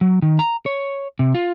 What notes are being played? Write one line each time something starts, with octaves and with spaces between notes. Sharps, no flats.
F#3
D#3
A#5
C#5
C3
F4